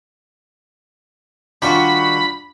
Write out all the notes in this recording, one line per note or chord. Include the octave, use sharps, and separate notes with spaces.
D#3 G3 D4 F4 F#4 B5